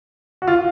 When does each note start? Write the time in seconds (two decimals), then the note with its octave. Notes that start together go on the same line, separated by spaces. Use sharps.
0.42 F#4
0.48 F4